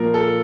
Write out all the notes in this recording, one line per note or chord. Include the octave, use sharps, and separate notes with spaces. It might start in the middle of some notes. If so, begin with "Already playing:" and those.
Already playing: A#2 F3 A#4
A4